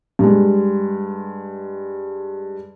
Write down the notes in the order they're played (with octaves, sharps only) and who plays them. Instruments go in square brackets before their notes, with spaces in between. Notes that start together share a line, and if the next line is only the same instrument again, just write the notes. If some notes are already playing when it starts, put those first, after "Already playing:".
[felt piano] G2 G#3